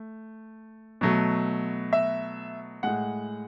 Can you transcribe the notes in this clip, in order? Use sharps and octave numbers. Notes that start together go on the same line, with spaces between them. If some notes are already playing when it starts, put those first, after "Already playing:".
Already playing: A3
B2 F#3 A3
E5
A2 G#3 F#5